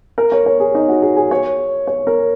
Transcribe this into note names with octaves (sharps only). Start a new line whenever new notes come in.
A#4
C#5
C#5
G#4
D#4
F#4
G#4
G#4
C#5
C#5
A#4